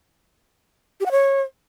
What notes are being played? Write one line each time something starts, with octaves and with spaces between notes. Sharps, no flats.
G4
F#5
C#5